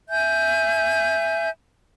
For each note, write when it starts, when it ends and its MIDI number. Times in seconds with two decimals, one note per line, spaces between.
0.09 1.49 76
0.09 1.49 80
0.09 1.49 91